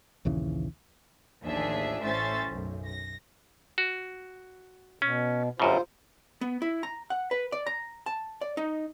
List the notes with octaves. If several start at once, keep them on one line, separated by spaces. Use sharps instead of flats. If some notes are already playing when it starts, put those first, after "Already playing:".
A#1 D#2 C#3 E3
A1 D#2 F3 D4 G#4 E5
A1 A2 C#4 C5 E5 A6
B1 F#2
A#6
F#4
B2 C#4
G1 F#2 B2 F4 C5
B3
E4
A#5
F#5
B4
D5
A#5
A5
D5
D#4